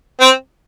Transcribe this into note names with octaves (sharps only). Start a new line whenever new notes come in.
C4